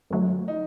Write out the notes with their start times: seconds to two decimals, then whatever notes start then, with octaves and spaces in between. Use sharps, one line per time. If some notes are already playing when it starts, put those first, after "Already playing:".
0.10 F#2 D3 F#3 A3
0.48 D#4